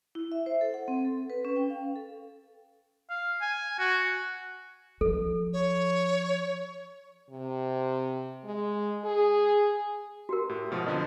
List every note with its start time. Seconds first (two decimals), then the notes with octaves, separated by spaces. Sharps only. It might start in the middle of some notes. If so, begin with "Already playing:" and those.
0.15 E4
0.32 E5
0.46 C5
0.61 A4
0.74 F#5
0.88 C4
1.05 A4
1.30 B4
1.45 C#4
1.56 G5
1.70 F5
1.96 A4
3.10 F5
3.41 G#5
3.79 F#4
5.01 F3 A4
5.53 C#5
7.31 C3
8.44 G#3
9.05 G#4
10.29 F#4 G4 A#4
10.49 A2
10.71 G#2 B2 F3
10.86 F2 D3 F3 D#5